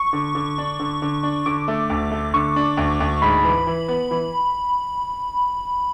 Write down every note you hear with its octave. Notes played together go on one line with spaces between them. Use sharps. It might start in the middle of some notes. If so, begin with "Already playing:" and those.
Already playing: C#6
D3
D3
D4
D3
D3
D4
D3 D6
A3
D2
A3
D3 C#6
D4
D2
D2
G#2 B5
E3
E3
B3
E3